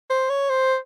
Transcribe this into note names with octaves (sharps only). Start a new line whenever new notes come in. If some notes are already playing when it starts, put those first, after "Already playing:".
C5
C#5
C5